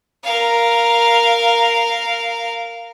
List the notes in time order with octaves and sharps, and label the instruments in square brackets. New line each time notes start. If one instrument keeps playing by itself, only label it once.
[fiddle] A#4 F5